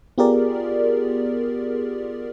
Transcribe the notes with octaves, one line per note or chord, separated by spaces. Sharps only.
B3 F4 G4 G#4 A#4 D5